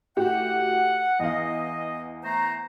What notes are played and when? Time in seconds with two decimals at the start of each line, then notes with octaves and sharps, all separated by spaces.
0.17 A2 F#4 G4 F#5
1.19 E2 D#5 F5
2.23 A3 C5 A#5